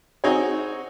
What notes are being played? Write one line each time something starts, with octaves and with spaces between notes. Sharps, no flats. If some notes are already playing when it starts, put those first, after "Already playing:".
C4 D#4 F#4 G#4 C#5